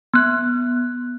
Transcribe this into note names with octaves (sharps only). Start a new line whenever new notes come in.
B3 F#6